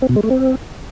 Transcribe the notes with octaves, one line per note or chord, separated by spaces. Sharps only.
C4
B2
G#3
A3
C4